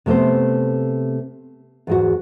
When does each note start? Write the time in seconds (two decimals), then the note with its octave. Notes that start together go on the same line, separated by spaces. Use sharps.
0.06 C3 A3 B3 C4 C5
1.87 E2 G#2 F#4